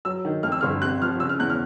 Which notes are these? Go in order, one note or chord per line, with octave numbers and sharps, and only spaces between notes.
F#3 E6
D#3
F2 F6
E6
G1 F6
C3 F#6
F3 F6
C#3 E6
F6
E2 F#6
F6